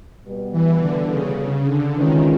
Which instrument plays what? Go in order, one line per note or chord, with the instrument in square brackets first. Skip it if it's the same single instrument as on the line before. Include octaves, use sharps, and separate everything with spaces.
[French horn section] B2 G3 B3
[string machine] E3
D3
C#3
C#3
D3
[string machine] D#3 [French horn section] E3 G#3 C#4 F4